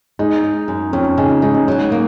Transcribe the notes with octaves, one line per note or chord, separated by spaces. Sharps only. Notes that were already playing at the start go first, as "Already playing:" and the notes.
G#3 D#4
D#4
F#2
F2 C#4
C#3 D#4
G#3 D#4
F#3 D#4
A#3